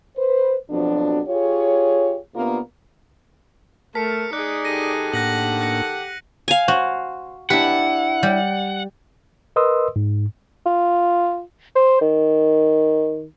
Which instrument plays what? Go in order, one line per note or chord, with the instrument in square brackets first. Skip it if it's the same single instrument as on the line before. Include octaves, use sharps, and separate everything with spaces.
[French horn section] B4 C5
F2 B2 F3 F#3 D4
F4 G4 G#4 C#5
C3 A#3 B3 D4 F4 A#4
[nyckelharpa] A3 [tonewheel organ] A#4 A5 F6 [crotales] B6 C#7
[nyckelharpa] D#4 G#4 [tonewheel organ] D5 D6 [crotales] F#6
[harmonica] D#3 G4 A4 [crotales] A#6 D#7
[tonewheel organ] A2 A#3 D4 [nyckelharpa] F#5 [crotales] F#6 A#6 F#7
[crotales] F#6 A#6 C#7
[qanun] F5 G#5
[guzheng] F#4 [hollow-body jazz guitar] C5
[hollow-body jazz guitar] D4 E4 G4 [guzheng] B4 [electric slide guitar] F#5
[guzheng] G3
[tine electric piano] A#4 B4 D#5 C6 D#6 E6
G#2
[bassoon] F4
C5
D#3